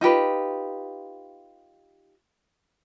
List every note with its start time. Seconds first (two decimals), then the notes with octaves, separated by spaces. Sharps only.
0.01 D#4 F4 G4 B4